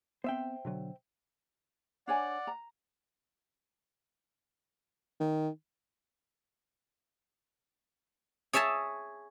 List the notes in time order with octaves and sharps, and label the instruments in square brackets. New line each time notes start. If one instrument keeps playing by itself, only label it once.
[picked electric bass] B3 C4 [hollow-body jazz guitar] C5 E5 G5
[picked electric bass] B2 D3 F#3
[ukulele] D4 C#5 G#5 [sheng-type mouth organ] D5 F#5
[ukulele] A#5
[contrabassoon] D#3
[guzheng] G#4 C#5 E5 G#5 A5